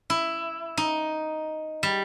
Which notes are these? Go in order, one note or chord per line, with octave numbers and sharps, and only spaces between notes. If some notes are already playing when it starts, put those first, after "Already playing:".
E4
D#4
G3